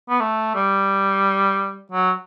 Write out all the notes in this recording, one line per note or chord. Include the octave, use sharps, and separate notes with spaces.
B3
A3
G3
F#3